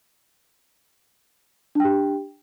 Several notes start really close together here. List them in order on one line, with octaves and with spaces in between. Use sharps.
D4 G5 G4